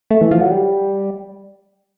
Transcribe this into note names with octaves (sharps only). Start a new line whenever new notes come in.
A3
E3
F3
F#3
G3